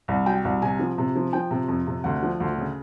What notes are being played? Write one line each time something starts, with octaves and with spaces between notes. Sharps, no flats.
C2
F#3 G5
C2
C3 G#5
F3
C3
F3
F3 G5
C3
F2
C3
D2 F#5
F3
D2
C#3